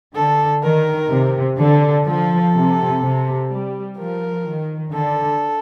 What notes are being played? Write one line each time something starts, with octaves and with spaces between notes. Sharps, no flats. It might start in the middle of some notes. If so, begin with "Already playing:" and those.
D3 A4
D#3 A#4
C3
D3 A4
F3 A4
C3
C3
G3
F3 A#4
D#3
D3 A4